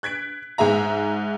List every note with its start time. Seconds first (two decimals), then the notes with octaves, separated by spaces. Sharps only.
0.03 F#6 G#6 B6 D7
0.58 G#2 G#4 E5 A#5